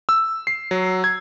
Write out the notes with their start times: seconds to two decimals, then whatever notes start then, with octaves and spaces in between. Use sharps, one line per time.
0.09 E6
0.47 C7
0.71 F#3
1.04 G#6